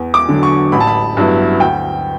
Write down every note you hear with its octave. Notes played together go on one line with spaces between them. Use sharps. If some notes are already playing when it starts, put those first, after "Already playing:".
Already playing: E2
D6
D3 F#3
C#6
A1 B5
A5
B5
G2 F#3 B3 E4
D2 G5